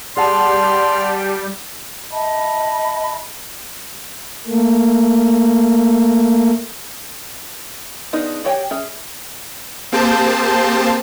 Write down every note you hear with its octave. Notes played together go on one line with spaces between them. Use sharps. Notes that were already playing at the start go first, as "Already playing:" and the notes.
G3 G4 G#4 D5 F#5 A5 C6 F6
D#5 E5 A5 B5
A3 A#3
B3 D4 D#4 F4 G#4
F#4 G4 C#5 G5 G#5
C#4 G#4 E5
A#3 C4 G4 G#4 C5 A5